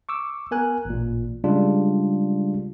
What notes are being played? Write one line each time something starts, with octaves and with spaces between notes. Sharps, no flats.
C#6 D6 E6
B3 A#4 G#5 F#6
A1 A#2
C#3 G3 G#3 D4 F4